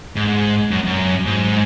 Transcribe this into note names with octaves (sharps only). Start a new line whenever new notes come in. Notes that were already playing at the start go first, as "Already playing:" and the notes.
G#2
F#2
F#2
G#2